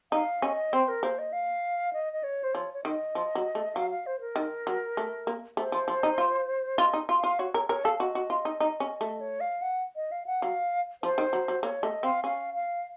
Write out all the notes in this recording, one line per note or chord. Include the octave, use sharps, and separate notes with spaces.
D#4 F5
C#4 D#5
C4 C5
A#4
A#3 C5
D#5
F5
D#5
D#5
C#5
C5
F3 C#5
C#5
D#3 D#5
F3
F#3
A3
F#3 F5
F5
C5
A#4
D#3
F#3
A3
A#3
A3 C5
F3
F3
D#4
F4
F4 D#5
D#4
F4
F5
F4
F#4 C#5
A#4 C#5
A#4 C#5
A4 F5
F#4 D#5
F#4
F4
D#4
D#4
C#4
A3
C#5
F5
F#5
D#5
F5
F#5
F#3 F5
F3 C5
D#3
F#3
F#3
A#3 C#5
A3 D#5
C4 F5
C#4 F5
F5